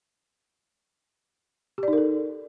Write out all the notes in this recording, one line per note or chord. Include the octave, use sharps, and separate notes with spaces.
D#4 G4 A4 A#4 D5